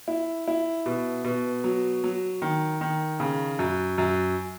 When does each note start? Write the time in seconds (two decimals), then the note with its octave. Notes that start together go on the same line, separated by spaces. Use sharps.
0.08 E4
0.48 E4
0.86 B2
1.24 B2
1.64 F#3
2.04 F#3
2.42 D#3
2.81 D#3
3.20 C#3
3.59 F#2
3.98 F#2